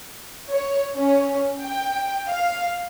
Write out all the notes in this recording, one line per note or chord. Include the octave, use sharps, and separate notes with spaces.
C#5
C#4
G5
F5